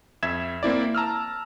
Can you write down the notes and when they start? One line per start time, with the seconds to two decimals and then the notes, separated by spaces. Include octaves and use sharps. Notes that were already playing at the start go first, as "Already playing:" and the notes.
0.23 F2 E5 G#6 E7
0.63 A#3 C4 E4 D5
0.95 A5 A#5 E6 F6